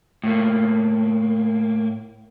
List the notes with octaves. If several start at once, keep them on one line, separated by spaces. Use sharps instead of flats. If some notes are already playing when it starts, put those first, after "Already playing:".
A2 A#3